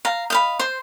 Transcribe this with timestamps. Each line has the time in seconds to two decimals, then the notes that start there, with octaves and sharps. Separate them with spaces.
0.05 F5 A#5
0.30 D#5 F5 B5
0.59 C5 C6